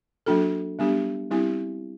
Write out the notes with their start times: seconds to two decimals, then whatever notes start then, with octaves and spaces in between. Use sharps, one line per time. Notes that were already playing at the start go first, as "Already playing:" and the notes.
0.26 F#3 A#3 D4 F#4 A4
0.79 G3 B3 D4 G4
1.31 G3 C4 E4 G4